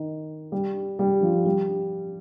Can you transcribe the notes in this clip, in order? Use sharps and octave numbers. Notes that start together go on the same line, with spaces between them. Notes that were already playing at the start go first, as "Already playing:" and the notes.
Already playing: D#3
G3
G3
F3
G3